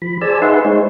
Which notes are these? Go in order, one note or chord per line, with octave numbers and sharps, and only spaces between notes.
F3 B5
G#4 C5 D5 G#5 A5 E6
D#4 G#4 B4 E5 F#5 C6
G#3 D#4 C5 C#5